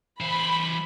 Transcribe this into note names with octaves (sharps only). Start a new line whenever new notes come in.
E3 C5 B5